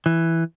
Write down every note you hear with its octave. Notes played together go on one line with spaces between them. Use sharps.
E3